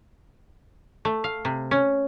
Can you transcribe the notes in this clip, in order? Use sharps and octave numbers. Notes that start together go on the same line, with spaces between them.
A3
F5
C3
C#4